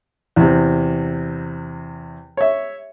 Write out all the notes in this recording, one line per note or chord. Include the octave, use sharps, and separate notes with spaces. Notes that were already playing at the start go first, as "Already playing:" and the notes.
E2 C3
C#5 E5